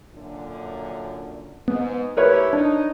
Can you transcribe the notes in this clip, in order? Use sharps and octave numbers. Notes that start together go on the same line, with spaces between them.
F#2 A#2 D3
G#2 B3
A3 E4 G4 A#4 B4 C#5
D4 D#4